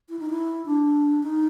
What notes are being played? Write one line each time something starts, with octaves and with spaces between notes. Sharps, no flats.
E4
D#4
E4
D4
D#4